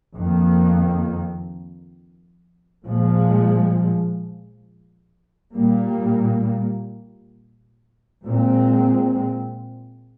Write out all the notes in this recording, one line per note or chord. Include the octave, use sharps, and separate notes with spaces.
F2 D#3 A#3
A#2 F3 G#3
A#2 G3 A#3
A#2 G#3 C4